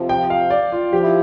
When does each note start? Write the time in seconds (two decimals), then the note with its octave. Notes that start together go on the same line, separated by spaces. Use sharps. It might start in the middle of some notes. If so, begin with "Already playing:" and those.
Already playing: F2 C3 F3
0.09 G5
0.30 F5
0.50 D5
0.72 F4
0.92 F3 G4
1.03 E4